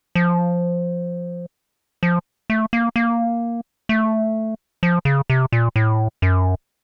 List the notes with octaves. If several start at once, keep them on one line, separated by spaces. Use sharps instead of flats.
F3
F3
A3
A#3
A#3
A3
F3
C#3
C3
A#2
A2
F#2